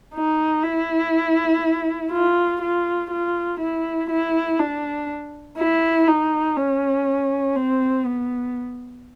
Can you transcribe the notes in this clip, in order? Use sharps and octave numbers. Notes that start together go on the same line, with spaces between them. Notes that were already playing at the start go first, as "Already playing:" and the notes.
D#4
E4
F4
F4
F4
E4
E4
D4
E4
D#4
C#4
C4
B3